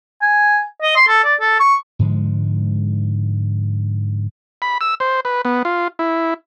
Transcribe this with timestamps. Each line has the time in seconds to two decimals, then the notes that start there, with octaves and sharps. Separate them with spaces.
0.22 G#5
0.82 D#5
0.96 C6
1.08 A4
1.24 D5
1.40 A4
1.60 C#6
1.99 G#2 D3 F3 G#3
4.62 B5
4.81 E6
5.00 C5
5.25 B4
5.45 B3
5.65 F4
5.99 E4